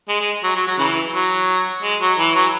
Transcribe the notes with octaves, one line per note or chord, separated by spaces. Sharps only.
G#3
G#3
F#3
F#3
F#3
C#3 E3
F#3
G#3
F#3
E3
F#3